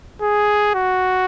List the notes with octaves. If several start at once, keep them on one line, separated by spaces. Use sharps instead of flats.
G#4
F#4